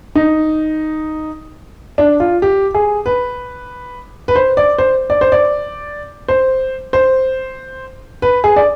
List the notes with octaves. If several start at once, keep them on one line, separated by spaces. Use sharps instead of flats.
D#4
D4
F4
G4
G#4
B4
B4
C5
D5
C5
D5
C5
D5
C5
C5
B4
G#4
D5